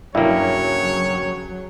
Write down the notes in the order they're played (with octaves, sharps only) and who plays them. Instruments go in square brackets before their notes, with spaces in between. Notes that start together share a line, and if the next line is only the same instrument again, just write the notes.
[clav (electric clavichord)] G2 A#3 [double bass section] C#3 F#3 [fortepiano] E4 [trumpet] C#5